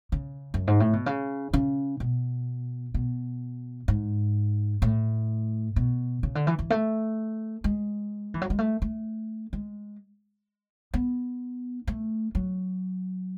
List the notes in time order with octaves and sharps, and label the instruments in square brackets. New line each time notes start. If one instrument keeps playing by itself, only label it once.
[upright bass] C#3
F#2
G#2
A2
B2
C#3
C#3
B2
B2
G#2
A2
B2
C#3
D3
E3
E3
A3
G#3
E3
F#3
G#3
A3
A3
G#3
B3
A3
F#3